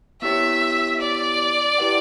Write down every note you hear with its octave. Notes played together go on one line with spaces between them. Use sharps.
B3 E4 G4 C#5 E5
D5
E4 G4 B4 F#5